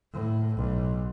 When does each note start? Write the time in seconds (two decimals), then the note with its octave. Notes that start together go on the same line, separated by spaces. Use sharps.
0.13 A2
0.55 B1